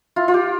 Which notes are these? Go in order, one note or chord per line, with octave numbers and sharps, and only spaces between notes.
E4 F4
F4
G4